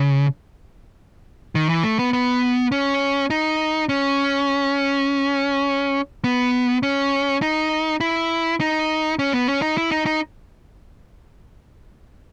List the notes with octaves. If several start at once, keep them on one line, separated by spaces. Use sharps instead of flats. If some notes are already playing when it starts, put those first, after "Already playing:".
Already playing: C#3
D#3
E3
A3
B3
B3
C#4
D#4
C#4
B3
C#4
D#4
E4
D#4
C#4
B3
C#4
D#4
E4
D#4
D#4